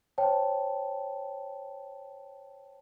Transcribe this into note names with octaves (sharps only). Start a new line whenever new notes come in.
C5 C#5 G5 A5